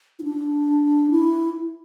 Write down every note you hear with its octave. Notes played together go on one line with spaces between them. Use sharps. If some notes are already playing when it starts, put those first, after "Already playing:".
E4
D4
E4